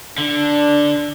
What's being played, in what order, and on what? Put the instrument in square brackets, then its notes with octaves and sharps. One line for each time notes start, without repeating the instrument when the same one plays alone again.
[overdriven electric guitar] D3 [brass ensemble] D4